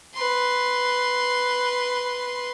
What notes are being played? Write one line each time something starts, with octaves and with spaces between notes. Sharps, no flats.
B4 C6